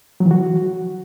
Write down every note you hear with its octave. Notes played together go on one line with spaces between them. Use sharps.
F#3
E3
F#4